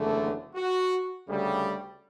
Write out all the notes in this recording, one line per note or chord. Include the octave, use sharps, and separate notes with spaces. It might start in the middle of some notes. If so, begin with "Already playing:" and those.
Already playing: F#1 E2 D3 A3
F#4
D2 C#3 G3